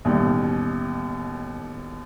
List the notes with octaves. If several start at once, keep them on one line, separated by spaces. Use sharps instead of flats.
A1 D#2 B2 G3